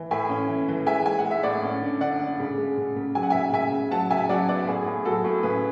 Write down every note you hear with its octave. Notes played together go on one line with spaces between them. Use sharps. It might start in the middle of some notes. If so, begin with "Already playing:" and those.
Already playing: E3
A2 E5 G#5
C#4
E3
E3
G#3 E5 G#5
G#3 G#5
F#5
G#3
E5
A2 D5 F#5
C#4
D3
D3 D5 F#5
D3
C#3
G#3
C#3
C#3
F#3 G#5
F#5
C#3 E5 G#5
C#3 E5 G#5
C#3
F#3 F#5 A5
C#3 E5 G#5
F#3 D5 F#5
B3 D5 F#5
A2 G#4
A2 G#4
F#3 F#4 A4
A2
C#3 G#4 B4